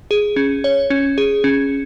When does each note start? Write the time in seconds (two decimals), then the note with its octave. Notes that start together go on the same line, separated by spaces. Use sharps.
0.11 G#4
0.36 C#4
0.64 C#5
0.90 C#4
1.18 G#4
1.44 C#4